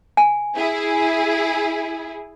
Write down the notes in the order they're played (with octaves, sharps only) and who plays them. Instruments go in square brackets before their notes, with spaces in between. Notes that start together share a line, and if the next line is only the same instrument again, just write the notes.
[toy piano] G#5
[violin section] E4 G#4